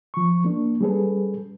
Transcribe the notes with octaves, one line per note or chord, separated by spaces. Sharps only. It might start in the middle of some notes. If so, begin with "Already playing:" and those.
F3 C#6
A#3 D4
G3 C#4 G#4 A4 B4